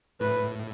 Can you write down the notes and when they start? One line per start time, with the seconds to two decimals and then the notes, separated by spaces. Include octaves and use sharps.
0.20 A2 B4